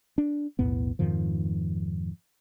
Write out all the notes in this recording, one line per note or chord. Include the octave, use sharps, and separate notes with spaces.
D4
B1 E2 A2 B3
F2 G#2 D#3 F3